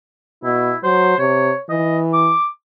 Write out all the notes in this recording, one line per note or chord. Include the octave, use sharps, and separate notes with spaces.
B2 E4
F#3 C5
C3 C#5
E3 D#5
D6